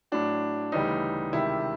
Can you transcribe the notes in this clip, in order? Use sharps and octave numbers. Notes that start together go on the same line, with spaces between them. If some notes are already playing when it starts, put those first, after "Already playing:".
A2 F#3 D4
D2 C#3 E3 G3 D#4
C#2 C3 D#3 G3 E4